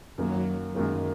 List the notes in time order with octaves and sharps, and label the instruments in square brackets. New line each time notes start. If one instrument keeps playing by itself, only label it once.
[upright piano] F#2 D#3 A#3 [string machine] F#3
[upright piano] F#2 D#3 A#3 [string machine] G#3